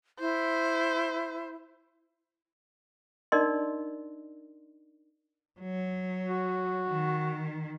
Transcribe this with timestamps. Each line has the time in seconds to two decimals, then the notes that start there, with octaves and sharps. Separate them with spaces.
0.20 E4 C5
3.32 D4 D#4 A#4 D5 D#5 C6
5.61 F#3
6.27 F#4
6.88 D#3